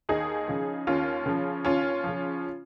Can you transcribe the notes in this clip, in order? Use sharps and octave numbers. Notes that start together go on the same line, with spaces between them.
D#2 D#4 G#4
C#3 F3
D#2 C#4 F4
C#3 F3
D#2 C#4 F4
C#3 F3